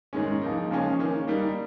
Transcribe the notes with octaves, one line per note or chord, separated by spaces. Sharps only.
G#2 D#3 G#3 C#4
F3 A#3 D#4
C#3 F3 G#3 C#4
D#3 A#3 C#4
G3 A#3 D#4